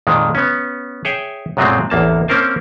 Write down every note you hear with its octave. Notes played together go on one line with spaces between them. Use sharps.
F2 A#2 D#3 G#3
B3 C#4
G#4 C#5 E5 G5
F#2 A#2 F#3 G#3 A3 C4
A1 E2 A#3 A5
A#3 C4 C#4 A#4 C5 A5